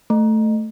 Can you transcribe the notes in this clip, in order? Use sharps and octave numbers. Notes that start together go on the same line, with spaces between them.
A3